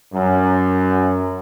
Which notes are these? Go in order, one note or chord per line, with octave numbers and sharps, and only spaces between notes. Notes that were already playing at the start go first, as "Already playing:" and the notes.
F#2